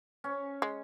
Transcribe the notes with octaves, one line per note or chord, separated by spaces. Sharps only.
C#4
G#3